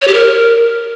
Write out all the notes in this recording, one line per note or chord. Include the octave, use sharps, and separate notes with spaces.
C#5
G4
A#4